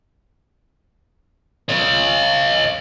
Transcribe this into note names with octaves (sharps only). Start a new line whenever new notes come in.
C#5 D#5